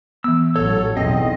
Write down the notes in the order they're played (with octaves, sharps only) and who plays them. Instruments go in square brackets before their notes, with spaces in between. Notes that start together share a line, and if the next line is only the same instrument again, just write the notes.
[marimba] E3 B3 [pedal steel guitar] E6
[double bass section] A1 F#3 [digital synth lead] A4 [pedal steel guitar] C#5
[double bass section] B1 E2 [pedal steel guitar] C4 [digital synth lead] D#5